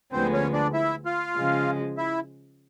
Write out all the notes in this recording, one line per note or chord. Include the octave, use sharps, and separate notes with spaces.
D2 D3 F3 G#3 B3 C4 C5
C#4 C#5
D4 D5
E4 E5
F4 F5
C#3 F3 G#3
E4 E5